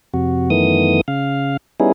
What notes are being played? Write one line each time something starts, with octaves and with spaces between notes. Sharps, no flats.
F2 C3 F#4
F#2 D#3 E3 A3 B3 D#6
C#3 F5
G3 B3 C#4 D#4 E4 G#4